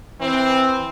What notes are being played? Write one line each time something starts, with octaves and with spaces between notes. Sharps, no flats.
E3 C4